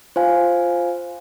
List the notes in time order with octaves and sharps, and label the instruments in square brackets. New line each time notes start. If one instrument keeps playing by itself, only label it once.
[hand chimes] F4 C5 F5 G#5